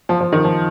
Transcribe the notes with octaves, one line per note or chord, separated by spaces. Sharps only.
F3
F3
D#3
F3